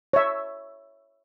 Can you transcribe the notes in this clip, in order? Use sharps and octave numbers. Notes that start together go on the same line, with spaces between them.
C#5 E5